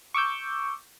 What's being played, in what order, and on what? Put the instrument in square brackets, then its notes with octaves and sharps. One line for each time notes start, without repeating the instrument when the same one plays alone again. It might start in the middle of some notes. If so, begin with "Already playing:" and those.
[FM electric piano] C#6 D6 E6 G6